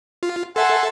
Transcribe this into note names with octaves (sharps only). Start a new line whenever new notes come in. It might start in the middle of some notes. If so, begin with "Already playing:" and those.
F4
A4 E5 F#5 G#5 A5 C6